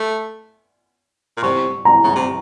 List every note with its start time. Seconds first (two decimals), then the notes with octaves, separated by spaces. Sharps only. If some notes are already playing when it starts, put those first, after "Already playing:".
Already playing: A3
1.37 A#2
1.43 C3 C#6
1.85 A#5
2.04 C#3
2.15 C3